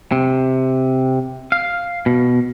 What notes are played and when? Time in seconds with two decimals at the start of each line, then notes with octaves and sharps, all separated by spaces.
0.12 C3
1.52 F5
2.06 B2